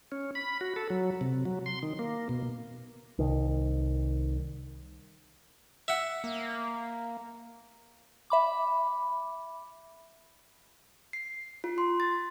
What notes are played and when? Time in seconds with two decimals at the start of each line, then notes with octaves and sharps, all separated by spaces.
0.12 C#4
0.35 B5
0.61 F#4
0.76 A4
0.90 F#3
1.21 C3
1.45 F#3
1.66 C6
1.83 D#3
1.99 A#3
2.29 B2
3.19 C2 D#3
5.88 E5 F#5
6.24 A#3
8.30 E5 B5 D6
11.13 C7
11.64 F4
11.78 C6
12.00 A6